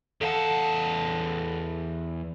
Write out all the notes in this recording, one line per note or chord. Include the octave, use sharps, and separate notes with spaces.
E2 A4 F5 F#5 A5